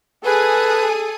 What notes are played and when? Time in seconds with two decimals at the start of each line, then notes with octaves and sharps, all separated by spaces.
0.24 G#4 A4 B4 G#5 D#6